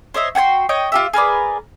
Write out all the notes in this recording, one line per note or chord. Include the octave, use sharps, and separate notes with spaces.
C5 C#5 D#5 E5
F#4 G5 G#5 C6
C#5 D#5 G5 G6
F4 G4 E5
G#4 A#4 B4 D5